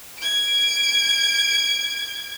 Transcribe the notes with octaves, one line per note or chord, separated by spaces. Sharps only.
G#6 D7